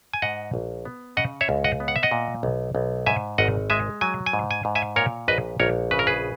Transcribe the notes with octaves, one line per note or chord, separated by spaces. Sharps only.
G#5
G#2 D#5 F#5
A#1
B3
C#3 D#5 F#5
C#5 E5
C#2
D#5 F#5
B3
F#5
E5
D#5 F#5
A#2
B1
B1
G#2 E5 G#5
G#1 D#5 F#5
G#3 E5 G#5
F#3 G#5
G#5
G#2
G#5
G#2
E5 G#5
A#2 A#4 C#5
A#1 B4 D#5
A#1 A#4 C#5
C#3 B4
A#4
G#4 B4